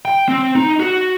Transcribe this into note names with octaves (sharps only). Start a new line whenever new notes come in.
G5
C4
D#4
F#4